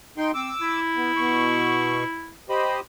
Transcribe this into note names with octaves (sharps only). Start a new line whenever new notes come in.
D#4 G5 C6
C4 D6 E6
E4
B3
B2 C#6
G4 C5 D#5 B5